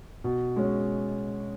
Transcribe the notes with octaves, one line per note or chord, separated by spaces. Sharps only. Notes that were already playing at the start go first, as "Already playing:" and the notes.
B2
G#3 C#4